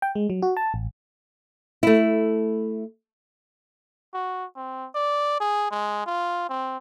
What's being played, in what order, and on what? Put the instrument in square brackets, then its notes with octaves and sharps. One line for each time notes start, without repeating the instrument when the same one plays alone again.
[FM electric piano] G5
G#3
F#3
F#4
A5
A1
[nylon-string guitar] A3 E4
[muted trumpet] F#4
C4
D5
G#4
G#3
F4
C4